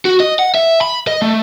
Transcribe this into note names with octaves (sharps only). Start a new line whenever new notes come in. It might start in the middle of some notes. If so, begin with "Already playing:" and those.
F#4
D#5
F#5
E5
B5
D#5
A3